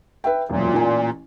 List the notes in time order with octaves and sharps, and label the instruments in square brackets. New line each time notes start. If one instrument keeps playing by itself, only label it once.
[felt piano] B4 E5 G5
[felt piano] E1 F#2 [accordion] A#2
[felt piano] A1 G#5